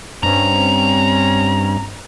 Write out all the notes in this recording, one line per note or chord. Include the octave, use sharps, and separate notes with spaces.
G2 C4 C#4 A#5